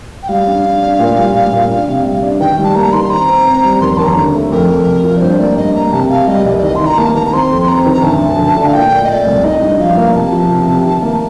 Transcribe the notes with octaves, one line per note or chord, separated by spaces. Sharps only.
G5
G3 F5
D4
D4
D4
A#2
G3
A#2
A#2
D4
C3
G3
D4
D#3 G5
G3
A5
A#3 A#5
D#3 C6
C4 A#5
C4
C4
G3
D#2 C6
D#2 A5
A#5
D3
A3
F2 A#4
F2
C3
F3
D5
G2 C5
A#3 D5
G2 D#5
A#3 A#5
C3 A5
C3 F5
G3 D#5
C2 D5
D5
D#3 D#5
C6
D#3
A#5
A#3 A5
D#3 A#5
A#5
C4 C6
F2
C4 A#5
D#3
A#5
D2 A5
D2
D2
D3
F5
A#2 G5
A#2
D#5
A3 D5
C2
D#4 D#5
G2
F3 F5
A#3
C3 A5
F3
C3
C3
D#3
A#3